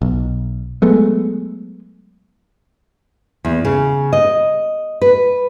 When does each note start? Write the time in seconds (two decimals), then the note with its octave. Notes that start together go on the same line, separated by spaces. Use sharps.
0.02 B1
0.82 F#3 G#3 A3 B3
3.45 E2
3.65 C#3
4.13 D#5
5.02 B4